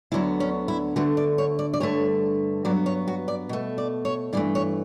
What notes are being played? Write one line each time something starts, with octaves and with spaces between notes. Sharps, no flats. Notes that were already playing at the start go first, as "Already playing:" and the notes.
D2 D3 F#3 B3 E4
C#4
E4
D2 D3 A3 F#4
D5
C#5
D5
D5
G2 D3 A3 C#5
G2 F#3 B3 D5
C#5
F#4
D5
B2 A3
D5
C#5
G2 E3 A3 D5
C#5